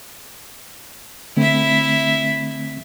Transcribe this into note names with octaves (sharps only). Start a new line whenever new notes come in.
D3 A3 C4 E4 E5